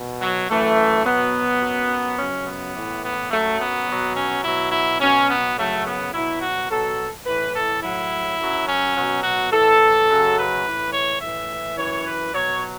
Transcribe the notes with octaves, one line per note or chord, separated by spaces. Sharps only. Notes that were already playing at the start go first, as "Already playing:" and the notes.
Already playing: B2
F#3
F#2 E3 A3
B2 F#3 B3
F#2 F#3
F#2 C#3 F#3 C#4
B3
A2 E3
B3
F#2 F#3 A3
B3
B2 F#3
C#4
B2 F#3 E4
E4
B2 F#3 C#4
B3
F#2 C#3 F#3 A3
B3
B2 F#3 E4
F#4
B2 F#3 A4
A2 E3 B4
A4
A2 F#3 E4
F#2 F#3
C#4
B2 F#3
F#4
A2 E3 A4
F#2 C#3 F#3
B4
A2 E3
C#5
A2 E3 E5
F#2 E3 C#5
B4
B2 F#3 C#5